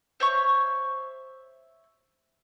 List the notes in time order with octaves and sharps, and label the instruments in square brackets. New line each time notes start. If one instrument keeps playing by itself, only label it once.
[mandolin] C5 C#5 E5 C#6